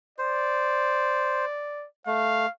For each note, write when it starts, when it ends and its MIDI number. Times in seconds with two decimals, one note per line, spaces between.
0.18 1.45 72
0.18 1.86 74
2.07 2.46 57
2.07 2.51 77